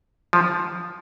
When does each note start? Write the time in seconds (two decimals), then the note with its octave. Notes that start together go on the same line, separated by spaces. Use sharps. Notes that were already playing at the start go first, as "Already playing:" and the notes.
0.33 F3